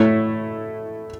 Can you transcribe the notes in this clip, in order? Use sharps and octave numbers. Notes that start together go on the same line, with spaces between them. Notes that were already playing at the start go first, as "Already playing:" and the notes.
Already playing: A2 A3 E4 C#5 E5